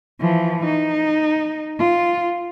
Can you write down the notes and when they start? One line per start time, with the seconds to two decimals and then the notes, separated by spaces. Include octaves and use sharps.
0.20 E3 F3
0.64 D#4
1.79 F4